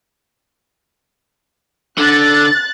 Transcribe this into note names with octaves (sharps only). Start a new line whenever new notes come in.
D3 F#6 A6